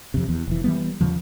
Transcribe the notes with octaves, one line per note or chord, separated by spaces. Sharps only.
F2 C3
E2
F1 E3
E3 G3 B3
E2 C#3 F3